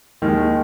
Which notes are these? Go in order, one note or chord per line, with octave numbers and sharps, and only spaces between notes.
D#2 D#3 G#3